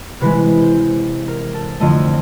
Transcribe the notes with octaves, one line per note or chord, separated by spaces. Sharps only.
C3 E3 G#3 B4
C5
A#4
A4
F2 D3 F3 A3 D#5